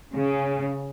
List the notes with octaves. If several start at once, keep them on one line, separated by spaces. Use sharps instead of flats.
C#3